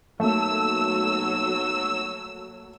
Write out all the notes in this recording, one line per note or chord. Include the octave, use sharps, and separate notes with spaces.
B1 F#3 A3 A#3 E6